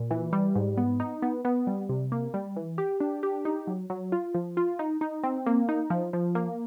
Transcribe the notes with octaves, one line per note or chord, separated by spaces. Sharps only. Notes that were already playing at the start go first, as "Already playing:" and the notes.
Already playing: A#2
E3
G3
G#2
B3
D#4
B3
B3
G3
C3
A#3
G3
E3
G4
D4
G4
D#4
F#3
F#3
F4
F3
F4
D#4
D#4
C4
A#3
D#4
F3
F3
A#3